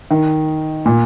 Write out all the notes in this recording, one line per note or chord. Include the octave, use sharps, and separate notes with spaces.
D#3
A#2